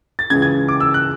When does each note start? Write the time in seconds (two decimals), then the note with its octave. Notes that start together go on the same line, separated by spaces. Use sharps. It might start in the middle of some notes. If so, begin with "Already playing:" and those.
0.19 A6
0.30 C#2 C#3 E3 G#6
0.42 G#6
0.69 D6
0.80 E6
0.94 F#6